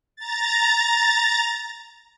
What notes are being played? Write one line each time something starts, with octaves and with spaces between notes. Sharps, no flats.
A#5 A6